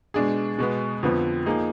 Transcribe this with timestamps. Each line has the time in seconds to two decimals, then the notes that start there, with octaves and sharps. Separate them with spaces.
0.14 B2 G#3 D4 G#4
0.58 B2 G#3 B3
1.03 F2 D3 F3 B3
1.46 F3 A#3 D#4 G#4